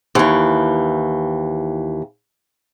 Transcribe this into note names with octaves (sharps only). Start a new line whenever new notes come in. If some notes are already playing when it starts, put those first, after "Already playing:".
D#2 E3